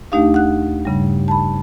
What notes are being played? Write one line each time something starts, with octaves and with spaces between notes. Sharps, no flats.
D#2 A3 D4 D#4 G4 F5
F#5 F#6
G2 C#3 G3
A5 B5